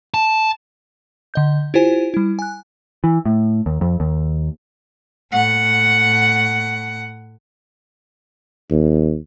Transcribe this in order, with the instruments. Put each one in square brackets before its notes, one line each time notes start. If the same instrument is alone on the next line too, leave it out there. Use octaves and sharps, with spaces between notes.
[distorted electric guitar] A5
[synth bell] D3 D#5 G6
E4 F4 G4 C5 G#5
G3 E4
G#5 F#6
[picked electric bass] E3
A2
D#2
F2
D#2
[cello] A2 F#5
[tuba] D#2